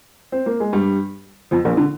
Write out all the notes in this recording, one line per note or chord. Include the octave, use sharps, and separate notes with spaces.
C4
A#3
G#3
G2 G3
F2 F3
A#1 A#2
D3